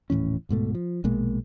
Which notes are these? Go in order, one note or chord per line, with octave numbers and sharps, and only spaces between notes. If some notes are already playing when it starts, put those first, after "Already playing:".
D#1 A2 E3 C#4
D1 G#2 B2 A3
F3
A#1 B2 G#3 A#3